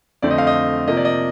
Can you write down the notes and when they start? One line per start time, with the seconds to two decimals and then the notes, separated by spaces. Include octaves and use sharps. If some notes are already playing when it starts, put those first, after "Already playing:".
0.22 F2 D3 A3 C4 D5
0.31 D#5
0.38 F5
0.47 D#5
0.88 C3 F3 A#3 D#5
0.97 D5
1.05 D#5